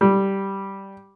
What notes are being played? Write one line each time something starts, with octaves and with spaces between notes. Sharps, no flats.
G3